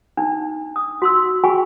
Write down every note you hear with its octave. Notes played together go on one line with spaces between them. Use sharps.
D4 D#4
D#6
F#4 C6 E6
F#4 G#4 G5 G#5 B5 C#6